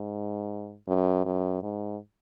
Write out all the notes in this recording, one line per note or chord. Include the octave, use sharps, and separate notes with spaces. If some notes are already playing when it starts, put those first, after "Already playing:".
Already playing: G#2
F#2
F#2
G#2